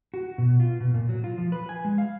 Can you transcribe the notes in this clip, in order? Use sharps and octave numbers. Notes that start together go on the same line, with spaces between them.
F#4
B2
F4
B2
A#2
F#3
F4
F3
B4
G#5
G#3
F5